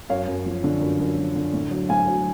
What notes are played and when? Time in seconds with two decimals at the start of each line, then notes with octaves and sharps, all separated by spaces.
0.09 F#2 C#5 F5
0.27 F#2
0.46 F3
0.64 D3
0.81 F#2
1.00 F#2
1.18 F3
1.35 D3
1.53 A2
1.71 F#3
1.89 A2 F5 G#5
2.07 F#3